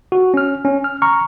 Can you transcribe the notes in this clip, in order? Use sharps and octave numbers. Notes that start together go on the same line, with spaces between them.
F#4
C#4 F6
C#4
F6
A#5 C#6 F6